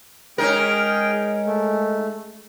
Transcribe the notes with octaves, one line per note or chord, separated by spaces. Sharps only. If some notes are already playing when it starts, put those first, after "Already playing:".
G#3 C#4 D#4 G#4 A#4 G5
A3